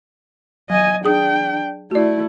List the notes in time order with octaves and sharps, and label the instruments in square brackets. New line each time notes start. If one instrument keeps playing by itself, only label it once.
[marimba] F#3 [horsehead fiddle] D#5 G#5
[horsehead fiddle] D4 G5 [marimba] G#4 D#6
[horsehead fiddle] A3 E4 [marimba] F#4 D5